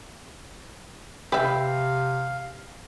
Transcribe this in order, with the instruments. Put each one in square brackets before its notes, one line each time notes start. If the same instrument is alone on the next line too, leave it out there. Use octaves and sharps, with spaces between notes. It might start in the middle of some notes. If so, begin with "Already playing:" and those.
[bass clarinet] C3 [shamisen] B4 E5 [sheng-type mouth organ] F5 [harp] G5